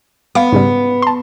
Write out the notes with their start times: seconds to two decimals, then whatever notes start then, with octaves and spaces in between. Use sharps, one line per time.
0.35 B3 F5 D6
0.53 G#2 C#3 G3
1.02 A5 C6